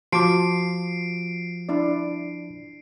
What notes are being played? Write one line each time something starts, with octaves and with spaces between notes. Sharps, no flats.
F3 F#4 A5 D6 C7 D7
D4 E4 D5